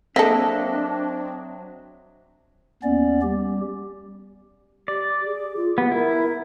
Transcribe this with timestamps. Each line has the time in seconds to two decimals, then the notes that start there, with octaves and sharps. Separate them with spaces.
0.16 F#3 A#3 C4 D4 A4 D#5 E5
2.83 D#2 B3 C#4 D5
3.22 G3 G4
4.88 G4 D5
5.25 G#4
5.57 F4
5.78 B3 G4
5.91 E4 A#4